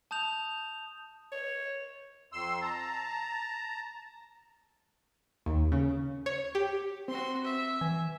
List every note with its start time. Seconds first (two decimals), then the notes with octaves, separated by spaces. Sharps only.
0.11 A5 D#6 G6 F7
1.32 C#5
2.32 F2 C6 E6
2.61 A5 A#5
5.46 D#2
5.72 C#3
6.26 C#5
6.55 G4
7.08 C4 F#4 C6
7.44 E5
7.81 E3 G#5